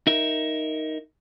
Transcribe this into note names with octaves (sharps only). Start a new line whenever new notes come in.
D#4 A#4 E5